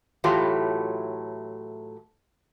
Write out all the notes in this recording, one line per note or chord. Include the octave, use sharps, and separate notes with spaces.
A2 E3 F#3 A3 F4 G4